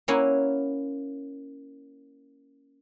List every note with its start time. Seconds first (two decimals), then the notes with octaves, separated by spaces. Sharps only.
0.08 A#3 C#4 E4 F#5 G#5